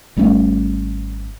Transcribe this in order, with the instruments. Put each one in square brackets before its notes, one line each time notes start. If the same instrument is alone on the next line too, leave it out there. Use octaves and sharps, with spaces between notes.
[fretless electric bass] G#1 G3 A3 C#4